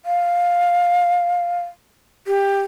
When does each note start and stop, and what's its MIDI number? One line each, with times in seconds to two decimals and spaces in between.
0.05 1.61 77
2.27 2.60 67